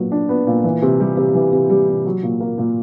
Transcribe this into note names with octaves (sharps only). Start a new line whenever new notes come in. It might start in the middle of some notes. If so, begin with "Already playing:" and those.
Already playing: A#2 F#3 B3 D4
D4
B3
A#2
E3
C3
G3
C3
E3
C3
G3
C3
F#3
A#2
A#3
A#2